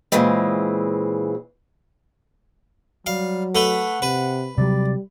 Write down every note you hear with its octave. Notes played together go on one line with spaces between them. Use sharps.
A#2 C#3 E3 G#3 C4
F#3 G3 F5
A3 B4 F#5
C3 B4
C3 F#3 G3 D5